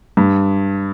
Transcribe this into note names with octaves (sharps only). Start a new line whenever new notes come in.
G2